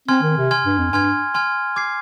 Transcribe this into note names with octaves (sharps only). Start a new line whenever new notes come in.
C4 G#5 C6 F6 G#6
D#3
C3
G#5 C6 F6 G#6
G2
F2
G2 G#5 C6 F6 G#6
G#5 C6 F6 G#6
D6 G#6 C7